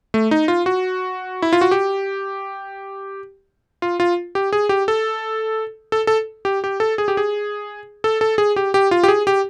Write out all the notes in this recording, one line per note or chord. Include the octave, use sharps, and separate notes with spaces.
A3
D#4
F4
F#4
E4
F4
F#4
G4
F4
F4
G4
G#4
G4
A4
A4
A4
G4
G4
A4
G#4
G4
G#4
A4
A4
G#4
G4
G4
F4
G4
G#4
G4